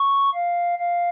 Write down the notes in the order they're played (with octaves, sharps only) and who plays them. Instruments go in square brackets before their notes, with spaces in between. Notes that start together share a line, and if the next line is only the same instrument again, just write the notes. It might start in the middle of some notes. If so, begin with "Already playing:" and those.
Already playing: [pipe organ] C#6
F5
F5